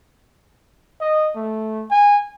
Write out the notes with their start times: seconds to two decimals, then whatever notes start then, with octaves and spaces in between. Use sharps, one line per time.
1.01 D#5
1.36 A3
1.91 G#5